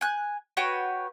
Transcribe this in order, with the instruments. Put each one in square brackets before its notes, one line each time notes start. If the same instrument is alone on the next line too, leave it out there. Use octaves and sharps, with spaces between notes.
[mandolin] G#5 F#6
F#4 B4 C#5 G5